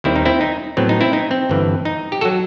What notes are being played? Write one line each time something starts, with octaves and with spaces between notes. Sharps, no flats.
D#2 D#3 G3 C4 E4
D#4
C4 E4
D#4
A2 F#3 B3 C4
D#4
C4 E4
D#4
C4
G1 G2 E3
D#4
G4
F#3 F#4 A4